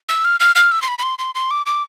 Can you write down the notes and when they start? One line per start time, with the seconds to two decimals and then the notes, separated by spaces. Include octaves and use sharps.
0.09 E6
0.25 F6
0.40 F6
0.56 F6
0.72 E6
0.82 C6
0.88 B5
0.99 B5
1.03 C6
1.19 C6
1.35 C6
1.51 D6
1.66 D6